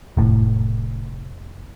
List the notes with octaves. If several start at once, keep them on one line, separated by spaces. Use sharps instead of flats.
F1 A2